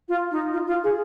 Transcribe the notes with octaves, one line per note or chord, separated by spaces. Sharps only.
F4
D#4
F4
F4
G#4